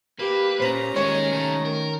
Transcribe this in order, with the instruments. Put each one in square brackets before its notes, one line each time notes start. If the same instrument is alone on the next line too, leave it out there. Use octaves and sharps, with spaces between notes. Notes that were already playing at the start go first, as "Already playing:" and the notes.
[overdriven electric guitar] A#3 [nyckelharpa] G4 [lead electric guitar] B4
[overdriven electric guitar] A#2 [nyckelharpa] C#4 A#5 [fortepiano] C5
[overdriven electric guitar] D#3 [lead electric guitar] G#3 [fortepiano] C#5
[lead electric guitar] C2 A3
A#4